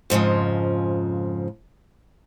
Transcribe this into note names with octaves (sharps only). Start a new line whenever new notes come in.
F2 G#2 C#3 F3